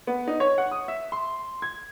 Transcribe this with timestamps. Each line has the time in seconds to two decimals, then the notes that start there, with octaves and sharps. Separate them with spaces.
0.07 B3
0.28 D#4
0.40 C#5
0.58 F#5
0.71 D#6
0.88 E5
1.12 C6
1.62 G#6